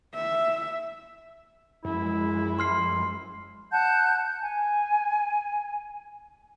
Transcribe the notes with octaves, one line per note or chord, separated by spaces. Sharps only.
E5
F#2 F3 G#3 E4
C6 F6 C7
F#5 A5 F#6 G6
G#5